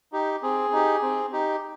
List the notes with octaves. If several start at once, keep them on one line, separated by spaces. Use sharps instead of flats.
D#4 G4
C4 G#4
D#4 G4
C4
D#4 G4